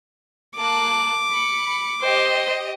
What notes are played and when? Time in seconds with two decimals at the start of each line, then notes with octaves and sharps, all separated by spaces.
0.57 A#3 A5 D6 F#6
1.31 B5 C#7
2.02 G4 C5 D#5